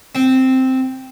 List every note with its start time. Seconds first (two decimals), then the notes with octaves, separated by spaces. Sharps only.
0.15 C4